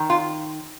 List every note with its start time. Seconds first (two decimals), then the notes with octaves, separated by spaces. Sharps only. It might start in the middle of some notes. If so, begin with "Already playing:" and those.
Already playing: D#3
0.10 F4